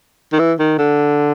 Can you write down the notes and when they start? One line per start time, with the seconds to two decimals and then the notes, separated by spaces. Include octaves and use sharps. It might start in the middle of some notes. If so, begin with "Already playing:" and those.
0.33 D#3
0.39 E3
0.59 D#3
0.78 D3